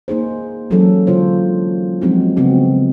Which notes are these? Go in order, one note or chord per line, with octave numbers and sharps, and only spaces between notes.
A#3 D#4 G#4 C5
E3 F#3 G#3 A#3 C#4 A4
D3 F4 C5 C#5
F3 F#3 G#3 C4 D#4 F#4
C#3 B3 C4 F#4